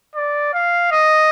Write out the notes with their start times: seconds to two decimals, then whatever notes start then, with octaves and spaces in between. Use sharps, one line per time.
0.16 D5
0.54 F5
0.92 D#5